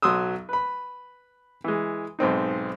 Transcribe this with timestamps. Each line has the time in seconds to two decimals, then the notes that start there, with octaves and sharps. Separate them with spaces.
0.02 B1 F#3 C6 D#6 E6
0.49 B4 B5
1.64 E3 G#3
2.19 B1 G#2 C4 D#4